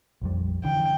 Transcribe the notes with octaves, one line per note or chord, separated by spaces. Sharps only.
A#1 F2 G3
D3 E3 G5